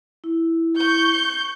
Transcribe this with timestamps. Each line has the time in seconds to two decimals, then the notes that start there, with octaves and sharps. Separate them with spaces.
0.24 E4
0.77 C#6 G6